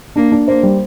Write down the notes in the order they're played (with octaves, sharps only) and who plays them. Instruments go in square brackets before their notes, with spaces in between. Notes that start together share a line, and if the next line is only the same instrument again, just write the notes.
[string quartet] A#3 [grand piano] D4
[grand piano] D4
[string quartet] A#3 [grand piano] C5
[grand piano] G3